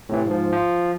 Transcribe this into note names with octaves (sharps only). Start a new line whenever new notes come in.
A2 C3 E3
G#2 F3
F3